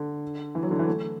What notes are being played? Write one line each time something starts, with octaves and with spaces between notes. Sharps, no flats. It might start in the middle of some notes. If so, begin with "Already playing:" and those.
Already playing: D3
E3
F#3
D3
E3
A3